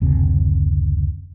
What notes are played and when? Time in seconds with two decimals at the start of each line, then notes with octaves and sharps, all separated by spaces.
0.01 F#1 D2 C3